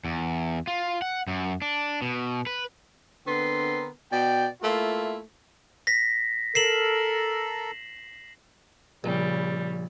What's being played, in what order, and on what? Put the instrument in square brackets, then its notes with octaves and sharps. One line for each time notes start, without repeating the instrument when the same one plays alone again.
[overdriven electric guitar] E2
F4
F#5
F#2
D4
B2
B4
[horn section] D3 B3 C4 A#4 C6
B2 D5 G5
A3 A#3 E4 F4
[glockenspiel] A#6 B6
[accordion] A4 A#4 [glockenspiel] C7 E7 F#7
[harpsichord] A#1 [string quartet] C#3 G3